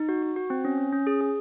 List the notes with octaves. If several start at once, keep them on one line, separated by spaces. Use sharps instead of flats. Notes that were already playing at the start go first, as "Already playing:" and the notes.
Already playing: D#4
F#4
F#4
F#4
C4
C#4
C#4
C#4
G#4
G#4